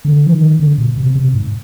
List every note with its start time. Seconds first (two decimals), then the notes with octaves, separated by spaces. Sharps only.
0.05 D3
0.26 F3
0.32 D#3
0.60 D3
0.78 A#2
0.97 C3
1.15 C3
1.34 G#2